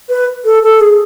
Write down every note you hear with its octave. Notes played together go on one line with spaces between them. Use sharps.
B4
A4
A4
G#4